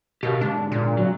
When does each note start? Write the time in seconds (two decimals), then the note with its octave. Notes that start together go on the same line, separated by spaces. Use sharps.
0.23 B2 G4 A#4 F5
0.41 G#2 D3 G#3 D4
0.72 A#2
0.97 C3 F#3